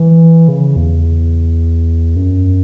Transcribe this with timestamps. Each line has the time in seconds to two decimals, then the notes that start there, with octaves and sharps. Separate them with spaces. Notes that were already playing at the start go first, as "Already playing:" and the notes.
Already playing: E3
0.48 C#3
0.76 E2
2.16 F#2